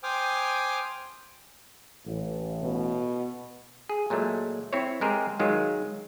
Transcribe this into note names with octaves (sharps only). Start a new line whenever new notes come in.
C5 G5 G#5 D6 D#6 F6
A1
B2
G#4
A#2 F#3 G#3 A3
C4 E4 C5 C#5
G#3 C4 G4 G#4 A#4 C5
D#3 F#3 G#3 F4